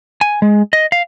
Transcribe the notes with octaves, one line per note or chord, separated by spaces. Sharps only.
G#5
G#3
D#5
F5